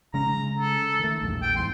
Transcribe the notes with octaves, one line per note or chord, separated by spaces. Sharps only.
C#3 G#3 C#4 A#5
A4
D#3 A3
A#1 E2 G2
G5
E2 G#2 C6